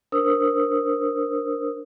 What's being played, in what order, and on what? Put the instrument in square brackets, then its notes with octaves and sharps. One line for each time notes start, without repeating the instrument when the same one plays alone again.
[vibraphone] D4 A#4 C5 D#6 E6